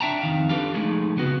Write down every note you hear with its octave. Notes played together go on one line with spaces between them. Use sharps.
D4 E5 G5 A5 A#5
F2 D#3 F5
D4 G4 A4 B4 F5
F3 G#3 A3 D#4 G#4
C#3 B3 F#4